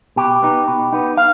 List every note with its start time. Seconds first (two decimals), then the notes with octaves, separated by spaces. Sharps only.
0.16 B2 G4
0.42 B3 D#4
0.68 B2
0.93 B3 D#4
1.17 F5